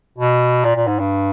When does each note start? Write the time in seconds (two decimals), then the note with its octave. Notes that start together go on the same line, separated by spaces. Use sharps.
0.18 B2
0.64 A#2
0.75 A#2
0.87 G#2
0.99 G2